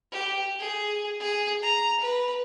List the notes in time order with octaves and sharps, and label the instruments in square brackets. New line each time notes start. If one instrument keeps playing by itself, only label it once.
[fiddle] G4
G#4
G#4
A#5
B4